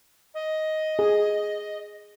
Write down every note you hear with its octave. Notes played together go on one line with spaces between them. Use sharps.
D#5
G#4